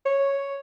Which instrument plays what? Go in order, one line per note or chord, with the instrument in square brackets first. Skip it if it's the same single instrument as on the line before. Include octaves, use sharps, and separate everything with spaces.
[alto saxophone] C#5